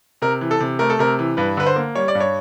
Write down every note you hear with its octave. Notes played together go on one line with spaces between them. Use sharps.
C3 A#4
E3
A4
C3
A3 A#4
A4
C3 A#4
E3
G2 B4
D3 B4
C5
A#3
G3 C#5
D5
G2
C#5